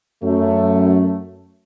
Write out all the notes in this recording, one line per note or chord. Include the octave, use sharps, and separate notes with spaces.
F#2 A3